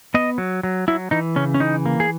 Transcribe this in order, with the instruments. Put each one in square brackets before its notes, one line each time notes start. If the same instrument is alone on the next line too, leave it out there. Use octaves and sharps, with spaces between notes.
[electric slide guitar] B3 D#5
F#3
F#3
F#3 E4
E3 D#4
C#3 C#4
C#4
E3 D#4
A#3
G#4